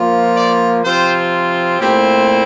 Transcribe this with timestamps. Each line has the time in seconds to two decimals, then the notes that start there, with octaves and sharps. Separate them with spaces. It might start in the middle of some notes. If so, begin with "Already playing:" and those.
Already playing: F3 A#3 F4
0.36 D5
0.83 C3 F3 C4 F4 C5
1.78 A#2 A3 C4 E4 G4